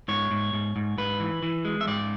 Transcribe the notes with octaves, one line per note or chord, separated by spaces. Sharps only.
G#2 C#5
G#2
G#2
G#2
G#2 B4
E3
E3
G#3
E5
G#2 D5